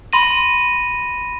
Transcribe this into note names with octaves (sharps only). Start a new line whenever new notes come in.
B5 C6 A#6 D#7